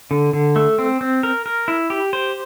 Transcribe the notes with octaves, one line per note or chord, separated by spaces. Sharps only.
D3
D3
A3
C4
C4
A#4
A#4
E4
G4
C5